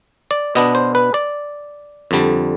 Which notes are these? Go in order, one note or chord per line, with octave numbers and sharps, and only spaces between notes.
D5
B2 B3 D4 D#5
C5
B4
D5
F2 D3 G3